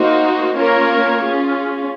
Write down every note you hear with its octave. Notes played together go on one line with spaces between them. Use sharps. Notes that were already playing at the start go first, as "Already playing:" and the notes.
Already playing: A#3 D#4 F#4 C5
A#3 C#4 F4 A#4 C#5
C#4 F4 G#4